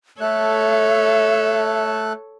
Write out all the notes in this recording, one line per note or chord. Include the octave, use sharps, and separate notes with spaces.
A3 A4 C#5 E5 F#6